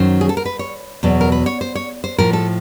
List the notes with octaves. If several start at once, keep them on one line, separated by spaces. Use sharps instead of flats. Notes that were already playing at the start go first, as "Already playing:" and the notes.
Already playing: F#2 D#3 F#3 C5
G#4
A4
A#4
B4
C#5
E2 B2 F#3
A#4
B4
C#5
C5
C#5
C5
A2 F3 A#4
A4